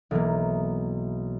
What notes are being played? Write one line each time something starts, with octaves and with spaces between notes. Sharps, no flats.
B1 E3 A#3